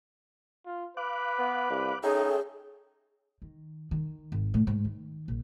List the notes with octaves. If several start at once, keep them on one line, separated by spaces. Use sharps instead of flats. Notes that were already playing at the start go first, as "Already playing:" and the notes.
F4
B4 F5 D6 F#6
B3
C2
C#4 D#4 G#4 A4 E5 G5
D#3
D#3
G#1
A2
G#2
D#3
A#1